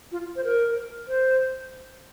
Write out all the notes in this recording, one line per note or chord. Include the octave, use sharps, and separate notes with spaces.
F4
C5
A#4
C5